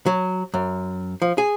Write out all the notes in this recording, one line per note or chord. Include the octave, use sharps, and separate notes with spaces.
F#3
F#2
F3
G#4